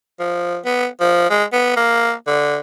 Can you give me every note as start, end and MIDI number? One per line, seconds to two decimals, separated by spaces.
0.20 0.57 53
0.65 0.87 59
1.01 1.28 53
1.30 1.44 56
1.53 1.72 59
1.77 2.13 58
2.27 2.61 50